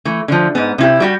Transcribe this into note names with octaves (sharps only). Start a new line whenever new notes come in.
E3 A3
D3 F3
G#2 B3
C3 E4 G4
G3 F#4 G4